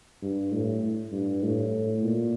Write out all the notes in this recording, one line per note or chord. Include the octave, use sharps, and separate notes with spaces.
G2
A2
G2
A2
A#2